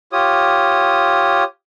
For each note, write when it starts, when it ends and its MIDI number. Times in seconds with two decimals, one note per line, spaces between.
0.13 1.44 65
0.13 1.44 67
0.13 1.44 73
0.13 1.44 87